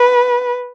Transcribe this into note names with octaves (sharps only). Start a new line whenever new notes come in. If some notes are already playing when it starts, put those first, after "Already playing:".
Already playing: B4